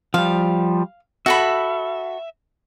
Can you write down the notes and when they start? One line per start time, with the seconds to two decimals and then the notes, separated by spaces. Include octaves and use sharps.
0.14 F3 G3 F5
1.26 F#4 A4 E5 B5